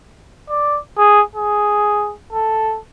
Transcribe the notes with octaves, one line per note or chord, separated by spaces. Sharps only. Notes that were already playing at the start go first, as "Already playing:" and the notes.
D5
G#4
G#4
A4